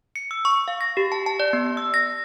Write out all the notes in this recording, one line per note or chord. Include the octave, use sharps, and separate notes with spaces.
C#7
E6
C#6
F5
A#6
G4
A5
A5
D5
B3
E6
A#6